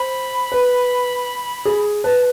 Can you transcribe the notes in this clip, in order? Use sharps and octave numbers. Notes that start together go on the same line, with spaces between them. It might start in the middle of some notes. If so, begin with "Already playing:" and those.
Already playing: C5 B5
B4
G#4
B4 A5